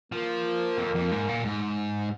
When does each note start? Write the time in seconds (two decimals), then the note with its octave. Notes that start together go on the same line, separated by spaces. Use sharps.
0.12 F3 A#3
0.78 F2
0.95 F2
1.11 G#2
1.28 A#2
1.45 G#2